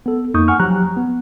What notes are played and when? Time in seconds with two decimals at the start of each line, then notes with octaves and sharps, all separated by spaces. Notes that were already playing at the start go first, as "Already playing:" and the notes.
0.06 B3 A4
0.34 F2 A#3 D#4 C#6 D#6 G6
0.48 F#5 G#5 C#6 F6
0.60 F3 F#3 G4 A#5 F#6
0.97 B3